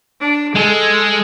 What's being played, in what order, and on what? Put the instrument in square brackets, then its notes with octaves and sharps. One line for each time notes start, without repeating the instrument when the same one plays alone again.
[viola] D4
[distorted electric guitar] G#3 [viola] A4